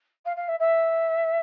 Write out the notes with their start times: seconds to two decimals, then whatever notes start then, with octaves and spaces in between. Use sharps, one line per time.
0.25 F5
0.36 F5
0.48 E5
0.59 E5